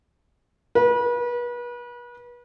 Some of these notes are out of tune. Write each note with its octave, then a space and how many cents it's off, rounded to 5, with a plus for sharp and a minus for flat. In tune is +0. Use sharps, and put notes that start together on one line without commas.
B4 -35